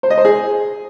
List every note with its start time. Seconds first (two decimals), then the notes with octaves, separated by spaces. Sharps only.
0.03 C5
0.10 D#5
0.18 C5
0.25 G#4